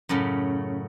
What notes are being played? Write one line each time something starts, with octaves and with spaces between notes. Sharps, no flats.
F#2 A2 C#3